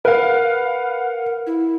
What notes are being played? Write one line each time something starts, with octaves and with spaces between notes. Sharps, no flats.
A#4 B4 F5 F#5
E4